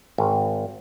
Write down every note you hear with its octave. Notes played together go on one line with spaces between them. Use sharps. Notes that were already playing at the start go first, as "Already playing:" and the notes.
G#1